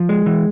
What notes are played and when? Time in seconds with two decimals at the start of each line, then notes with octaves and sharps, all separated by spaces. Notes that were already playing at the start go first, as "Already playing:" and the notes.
Already playing: F3
0.09 G#3
0.26 E3